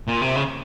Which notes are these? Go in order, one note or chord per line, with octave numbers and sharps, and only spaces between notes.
A#2
C3
C#3